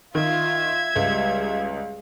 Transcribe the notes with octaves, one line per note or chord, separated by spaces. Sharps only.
D#3 F4 E5 G#6
C#2 G3 G#3